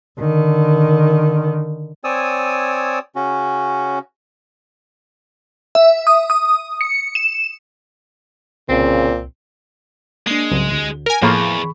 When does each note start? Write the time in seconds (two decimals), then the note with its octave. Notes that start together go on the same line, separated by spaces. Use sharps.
0.19 D3 D#3
2.04 C4 C#5 D5 G#5 D#6 E6
3.16 C#3 C#4 F#4
5.75 E5
6.07 D#6
6.30 D#6
6.81 C#7
7.15 E7
8.69 C2 A#2 C#3 C4
10.27 G#3 A#3 D4 C7
10.51 C2 G#2 C#3 F#3
10.72 D2
11.06 A#4 G#5
11.22 E2 A2 F3 A#3 G#4 B5 C#6